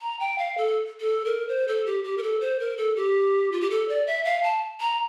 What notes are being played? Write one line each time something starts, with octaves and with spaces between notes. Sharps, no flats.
A#5
G5
F5
A4
A4
A#4
C5
A4
G4
G4
A#4
A4
C5
A#4
A4
G4
F4
G4
A4
D5
E5
F5
A5
A#5